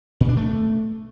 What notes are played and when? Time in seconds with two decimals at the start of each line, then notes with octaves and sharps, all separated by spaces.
0.20 A#2
0.29 D4
0.37 A3